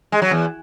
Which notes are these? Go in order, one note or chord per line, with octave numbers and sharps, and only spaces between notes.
G#3
F#3
E2